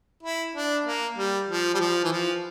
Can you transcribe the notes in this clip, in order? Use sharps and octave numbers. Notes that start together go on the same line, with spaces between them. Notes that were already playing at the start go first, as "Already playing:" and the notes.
E4
D4
A#3
G3
F3
G3
F3
E3
F3